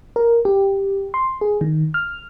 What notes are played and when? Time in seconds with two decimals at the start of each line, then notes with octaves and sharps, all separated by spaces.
0.16 A#4
0.45 G4
1.14 C6
1.41 G#4
1.61 D#3
1.94 F6